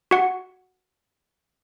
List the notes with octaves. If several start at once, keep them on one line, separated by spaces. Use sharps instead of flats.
F#4 F#5